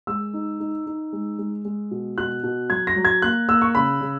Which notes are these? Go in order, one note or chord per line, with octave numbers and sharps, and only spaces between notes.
G#3 E6
D#4
D#4
D#4
G#3
G#3
G#3
B2
B2 F#6
B2
F#3 G#6
A#6
F#3
G#6
A#3 F#6
A#3 E6
C#6
C#3 B5
C#3